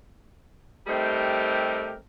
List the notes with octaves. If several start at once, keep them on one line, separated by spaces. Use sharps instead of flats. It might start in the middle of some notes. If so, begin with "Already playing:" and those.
G3 A3 C4 D#4 G4 A#4